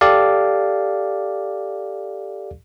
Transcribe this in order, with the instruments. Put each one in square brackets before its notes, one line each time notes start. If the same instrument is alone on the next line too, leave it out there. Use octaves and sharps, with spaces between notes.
[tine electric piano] G4 A4 D5 F5